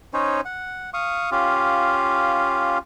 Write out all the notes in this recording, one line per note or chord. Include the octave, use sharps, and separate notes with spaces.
C#4 D#4 C5 C#5
F#5
F5 C#6 D#6
C#4 F4 G4 F5